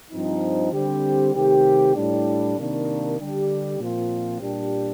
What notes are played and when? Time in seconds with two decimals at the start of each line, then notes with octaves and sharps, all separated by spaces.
0.11 G2 F3 C4 D#4
0.72 D3 G3 C4 G4
1.35 C3 D#3 A3 C4 G4
1.95 A2 G3 D4
2.56 C3 D#3 A#3 D4
3.18 D3 G3 D4 G4
3.79 A#2 F3 C4 F4
4.40 A#2 G3 D4 G4